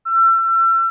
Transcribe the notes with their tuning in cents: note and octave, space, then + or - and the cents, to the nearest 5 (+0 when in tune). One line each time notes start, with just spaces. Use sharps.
E6 +35